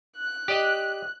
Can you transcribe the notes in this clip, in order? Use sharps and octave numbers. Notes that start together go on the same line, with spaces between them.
F#6
G4 D5 D#5